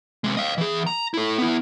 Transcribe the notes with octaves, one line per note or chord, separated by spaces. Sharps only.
C3 G#3
D#5 F5
E3 G#4
A#5
E4 A4
B3 E4